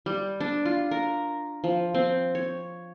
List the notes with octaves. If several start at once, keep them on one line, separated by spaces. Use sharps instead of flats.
G3
D4
F4
A#4
F3
C4
C#5